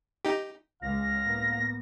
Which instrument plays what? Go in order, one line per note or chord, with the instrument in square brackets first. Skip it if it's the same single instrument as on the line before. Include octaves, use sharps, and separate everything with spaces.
[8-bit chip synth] D#4 G4
[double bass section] C#2 [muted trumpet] F5 [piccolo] A#6
[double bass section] A2 A#3 B3